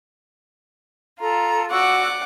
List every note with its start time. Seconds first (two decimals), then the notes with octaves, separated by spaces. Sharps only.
1.20 F4 A4 A#5
1.71 F#4 D5 F#5 C#6 D6 E6